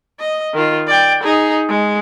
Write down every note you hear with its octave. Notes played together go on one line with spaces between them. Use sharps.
D#5
D#3 F4
D5 G5
D#4 G#4
G#3